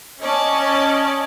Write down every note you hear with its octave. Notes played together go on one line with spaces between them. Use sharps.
C#4 D5 D#5 A5